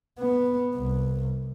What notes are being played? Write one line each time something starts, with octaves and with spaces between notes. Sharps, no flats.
B3
C2